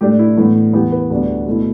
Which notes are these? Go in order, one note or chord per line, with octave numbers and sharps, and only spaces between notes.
A2 A3 D4 G4
E4
A2 E3 B3 D4
E2 E3 B3 G4
B4
D2 D3 G3 B3 D4
B2 A3 E4